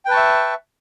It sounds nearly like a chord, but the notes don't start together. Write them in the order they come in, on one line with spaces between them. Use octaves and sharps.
G5 B4 A5 C#6 E5